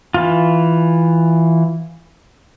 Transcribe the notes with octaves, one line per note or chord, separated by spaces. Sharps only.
E3 F4